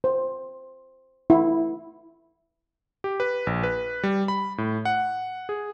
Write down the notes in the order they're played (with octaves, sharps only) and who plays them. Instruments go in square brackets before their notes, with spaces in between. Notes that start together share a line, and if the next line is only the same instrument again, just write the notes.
[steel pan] C5
E4
[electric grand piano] G4
B4
A#1
B4
G3
B5
A2
F#5
G#4